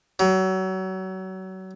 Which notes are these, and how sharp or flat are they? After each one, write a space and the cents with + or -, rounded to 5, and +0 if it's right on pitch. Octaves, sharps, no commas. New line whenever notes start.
F#3 +30